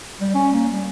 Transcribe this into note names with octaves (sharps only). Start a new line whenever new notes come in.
G3
C#4
A#3
G3